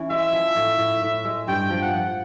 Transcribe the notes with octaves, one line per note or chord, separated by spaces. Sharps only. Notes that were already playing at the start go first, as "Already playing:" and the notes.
Already playing: E3 C#4
G#3 E5
F3
A2
A2
A2
G#3
G2 G5
F3
F#5
F3